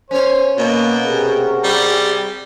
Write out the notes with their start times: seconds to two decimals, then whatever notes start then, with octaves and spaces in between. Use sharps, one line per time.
0.11 C#4 C5 C#5
0.58 B2 A#3 F#4 A#4
1.05 C3 G4 G#4
1.64 G3